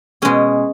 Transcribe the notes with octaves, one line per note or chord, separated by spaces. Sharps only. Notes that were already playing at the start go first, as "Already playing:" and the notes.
B2 G#3 C#4 G#4